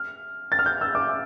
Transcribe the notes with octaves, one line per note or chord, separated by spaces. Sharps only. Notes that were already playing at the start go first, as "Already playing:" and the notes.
Already playing: F6
A6
F6
G6
E6
D6